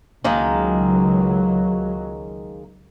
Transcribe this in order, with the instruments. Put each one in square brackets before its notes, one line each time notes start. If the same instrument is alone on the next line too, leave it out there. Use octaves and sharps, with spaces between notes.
[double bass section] C#2 F#3 [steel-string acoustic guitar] D#3 G#3 A#3